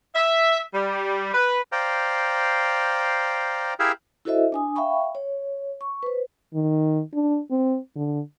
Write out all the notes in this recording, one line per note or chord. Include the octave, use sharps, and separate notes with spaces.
E5
G3
B4
C5 D5 F5 G5 A#5
E4 G4 G#4 A#4 E5 F5
E4 F#4 A4 C5 D#5 E5
D4 G#5 D#6
E5 F5 G5 B5 C#6
C#5
C#6
B4 C5
D#3
D4
C4
D3